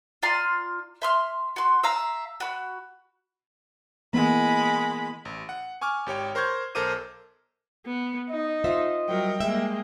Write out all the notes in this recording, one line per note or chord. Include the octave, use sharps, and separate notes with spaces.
F4 D5 A#5 C6
E5 C6 F6
F#4 C6
E5 F5 A#5
F#4 B5
E3 G#3 A#3 B3 B5
A1
F#5
G#5 C#6 D6 F6
G#1 G4 C#5 G5
A#4 C5 C6 C#6 G6 G#6
B1 A4 A#4 C5 D6 D#7
B3
D#4 D#5
F4 C5 E5
F#3 G3 A#4 G5
G#3 A#3 E5